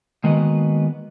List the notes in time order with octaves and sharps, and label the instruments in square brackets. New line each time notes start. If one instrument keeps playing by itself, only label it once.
[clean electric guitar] D#3 G#3 A#3 B3 F#4 D#5